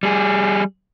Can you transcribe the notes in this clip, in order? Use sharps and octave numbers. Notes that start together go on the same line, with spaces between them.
G3 G#4